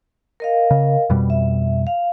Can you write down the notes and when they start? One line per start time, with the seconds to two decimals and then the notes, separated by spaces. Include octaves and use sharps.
0.40 A#4 D#5 F5
0.71 C#3
1.10 F2 B2 G3
1.30 E5
1.87 F5